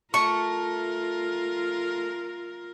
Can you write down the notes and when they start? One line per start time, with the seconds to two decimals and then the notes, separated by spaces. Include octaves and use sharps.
0.14 A3 F4 A#4 C#6